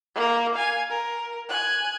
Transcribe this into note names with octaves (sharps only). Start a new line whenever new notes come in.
A#3 A#4
F5 G#5
A#4
G#5 F#6